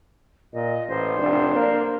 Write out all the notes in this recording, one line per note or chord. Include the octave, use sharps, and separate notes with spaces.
A#2 D#5
A1 C5
F1 D4
A#3